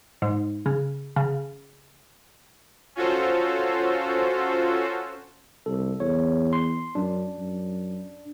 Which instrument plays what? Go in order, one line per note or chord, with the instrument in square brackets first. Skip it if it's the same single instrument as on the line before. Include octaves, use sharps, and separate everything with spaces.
[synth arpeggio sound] G#2
C#3
C#3
[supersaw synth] C#4 F4 F#4 A4 C5
[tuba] C2 [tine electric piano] A4
[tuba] E2 [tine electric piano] C#5
[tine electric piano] C6
[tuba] F#2 [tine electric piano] D4
[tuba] F#2